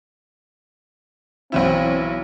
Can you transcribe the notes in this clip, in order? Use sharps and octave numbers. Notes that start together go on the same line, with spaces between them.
B1 E3 C4 E4